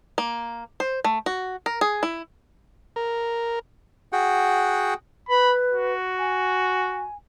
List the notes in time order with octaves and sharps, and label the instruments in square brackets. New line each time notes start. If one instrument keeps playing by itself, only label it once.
[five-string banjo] A#3
C5
A3
F#4
A#4
G#4
E4
[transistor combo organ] A#4
[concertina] F#4 G#4 F#5 G5
[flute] B4 [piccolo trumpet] B5
[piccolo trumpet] F#4
[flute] G#5